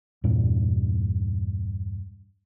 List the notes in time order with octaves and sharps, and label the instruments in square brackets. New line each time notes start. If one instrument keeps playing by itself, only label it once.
[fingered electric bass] E2 G2 A#2